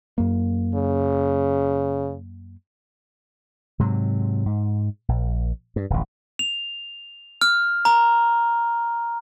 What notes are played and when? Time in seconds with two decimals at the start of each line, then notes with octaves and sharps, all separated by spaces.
0.18 F#2 A#3
0.75 C#3
3.79 G#2 C3 F#3
4.46 G#2
5.09 A#1
5.76 G2
5.90 D1 A1
6.39 F7
7.41 F6
7.85 A#5